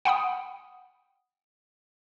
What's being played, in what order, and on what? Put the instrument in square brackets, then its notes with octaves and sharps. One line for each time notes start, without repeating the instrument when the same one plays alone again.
[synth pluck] F#5 G5 B5 D#6